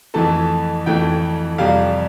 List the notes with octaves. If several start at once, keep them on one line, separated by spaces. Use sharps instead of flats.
F2 E3 A3 A5
F2 E3 A3 G5
F2 C3 G3 F5